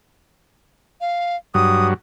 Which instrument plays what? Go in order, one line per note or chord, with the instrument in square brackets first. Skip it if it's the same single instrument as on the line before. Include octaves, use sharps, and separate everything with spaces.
[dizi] F5
[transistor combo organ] G2 F#3 [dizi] D#6